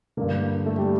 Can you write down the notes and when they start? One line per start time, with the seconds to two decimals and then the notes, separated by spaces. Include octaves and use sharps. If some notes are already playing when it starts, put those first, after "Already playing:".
0.17 G2 D3 A#3
0.66 A3
0.78 G3